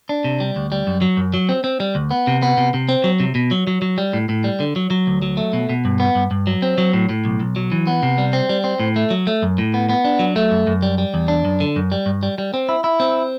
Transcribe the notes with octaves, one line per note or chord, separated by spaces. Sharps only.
D4
C3
G3
D2
G3
F#2
F#3
F#2
F#3
C4
C4
G3
D2
B3
C3
B3
C3
C3
C4
F#3
C3
B2
F#3
F#3
F#3
G3
A2
A2
G3
D3
F#3
F#3
D2
F#3
A3
B2
B2
G2
B3
G2
G2
F#3
C4
F#3
A2
A2
B1
B1
F#3
E3
B3
C3
G3
C4
G3
C4
A2
A3
F#3
A3
F#2
A2
B3
B3
D4
F#3
A3
F#2
F#2
G3
G3
E2
D4
F#2
D3
F#2
G3
G2
G3
G3
C4
E4
E4
C4